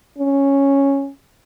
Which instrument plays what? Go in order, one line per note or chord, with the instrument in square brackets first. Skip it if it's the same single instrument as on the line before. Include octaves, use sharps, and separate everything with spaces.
[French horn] C#4